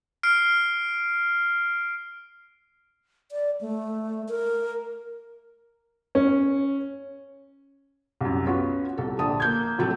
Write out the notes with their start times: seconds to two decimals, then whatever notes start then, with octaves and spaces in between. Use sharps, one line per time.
0.23 F6 C7 D7
3.32 D5
3.61 A3
4.29 A#4
6.15 C#4
8.21 C2 F#2
8.46 B3 C#4 F4 F#4
8.97 C2 A4
9.19 A#1 D3 A5 D#6
9.40 A#3 G6 G#6
9.78 A2 C3 F3 F#3 A3 A4